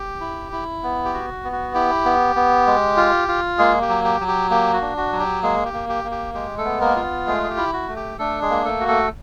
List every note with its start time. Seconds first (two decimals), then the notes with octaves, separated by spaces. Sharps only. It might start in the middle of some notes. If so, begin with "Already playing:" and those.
Already playing: G4
0.21 E4
0.52 E4
0.83 B3
1.05 G4
1.14 F#4
1.44 B3
1.52 F#4
1.74 E4 G4
2.05 B3
2.36 B3
2.67 G#3
2.97 F4
3.28 F4
3.58 G#3 A#3 G#4
3.82 G4
3.89 F#3
4.04 G4
4.20 F#3
4.28 G4
4.50 A#3 G4
4.74 F#4
4.81 D4
4.97 F#4
5.13 F#3
5.19 G4
5.43 G#3 A#3 G#4
5.66 G4
5.73 A#3
5.89 G4
6.04 A#3
6.11 G4
6.34 G#3 G4
6.58 A3 A4
6.65 B3
6.81 A#3 A#4
6.96 F4
7.27 G#3 A3 G#4
7.43 G#4
7.50 G4
7.57 E4
7.73 F#4
7.88 A3
7.96 G4
8.19 A3 D4 A4
8.41 G#3 G#4
8.50 A#3
8.65 A3 A4
8.81 F#4
8.88 A3 A4